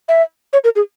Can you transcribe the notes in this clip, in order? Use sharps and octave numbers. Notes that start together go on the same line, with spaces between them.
E5
C#5
A#4
G#4